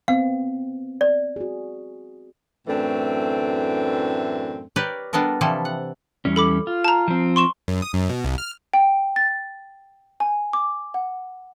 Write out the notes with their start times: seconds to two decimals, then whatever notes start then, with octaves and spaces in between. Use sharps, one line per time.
0.08 B3 C4 F5
1.01 D5
1.36 F#4 G#4
2.68 F#2 A2 E3 A3 C4 D4
4.76 G4 A#4 B4 C#5 D5 G5
5.13 G3 B3 D4 A4 A#4
5.41 C3 E3 F3 G3 E4 A4
5.65 F#5
6.25 E2 G3 C#4
6.36 A4 B5 D6
6.67 F4
6.84 A5 A#5
7.08 F3 C4
7.36 C6 C#6 E7
7.68 F#2
7.82 D#6
7.94 F#2
8.10 B2
8.25 C2
8.38 F6
8.74 G5
9.16 A6
10.20 G#5
10.53 D6
10.94 F#5